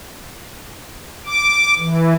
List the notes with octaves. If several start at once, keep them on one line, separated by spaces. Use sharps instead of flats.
D6
E3